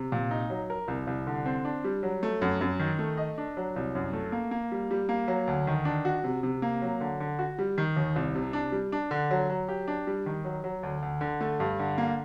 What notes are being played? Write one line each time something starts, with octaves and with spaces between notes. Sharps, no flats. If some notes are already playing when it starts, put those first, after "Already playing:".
Already playing: C3
A#2
D#4
F#3
A#4
C2
C2
D3
C4
D4
G3
F#3
A3
F#2
F#2
D#3
A3
D#5
D4
F#3
C2
F#2
A3
A#3
A#3
G3
G3
A#3
F#3
D2
D#3
D4
F#4
C3
C3
A#3
F#3
D3
D3
F#4
G3
D#3
D#2
C2
C3
D4
G3
D4
D3
F#3
F#3
G4
D4
G3
D#3
F#3
F#3
D2
D2
D3
A3
G2
D3
A#3